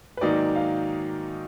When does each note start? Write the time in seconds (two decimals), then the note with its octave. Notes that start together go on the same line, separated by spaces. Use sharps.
0.17 B4
0.21 G#2 D#3 F#3 A#3 D#4 D5
0.56 F5